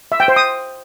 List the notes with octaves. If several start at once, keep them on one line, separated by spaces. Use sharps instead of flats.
E5
G5
C5
D#6